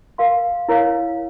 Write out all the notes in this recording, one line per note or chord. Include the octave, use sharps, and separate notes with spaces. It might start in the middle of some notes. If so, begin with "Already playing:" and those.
A#4 F5 C6
E4 A#4 C#5 F5